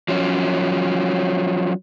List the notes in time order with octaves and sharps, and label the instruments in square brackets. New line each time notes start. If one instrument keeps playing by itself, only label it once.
[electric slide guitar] F3 F#3 C#4